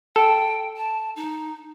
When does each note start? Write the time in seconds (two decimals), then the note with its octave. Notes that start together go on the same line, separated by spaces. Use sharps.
0.16 A4 G5
0.77 A5
1.16 D#4